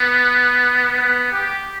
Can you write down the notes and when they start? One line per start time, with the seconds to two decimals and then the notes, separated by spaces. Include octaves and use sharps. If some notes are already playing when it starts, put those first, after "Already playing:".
Already playing: B3
1.02 B3
1.32 G4